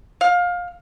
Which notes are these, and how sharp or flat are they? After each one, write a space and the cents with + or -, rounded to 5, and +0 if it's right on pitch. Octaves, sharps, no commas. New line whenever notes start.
F5 +25